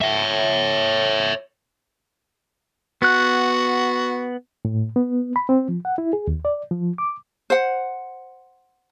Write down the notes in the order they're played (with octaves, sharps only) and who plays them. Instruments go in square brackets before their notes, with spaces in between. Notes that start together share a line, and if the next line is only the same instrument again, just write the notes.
[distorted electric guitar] C#5 E5
[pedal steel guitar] B3 F#6 [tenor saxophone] F#4
[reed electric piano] A2
B3
B5
C4
F3
F#5
E4
G#4
D#2
D5
F3
D6
[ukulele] C5 F#5